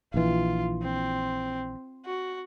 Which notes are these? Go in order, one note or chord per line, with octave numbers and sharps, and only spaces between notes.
A#1 E3 F4
C4
F#4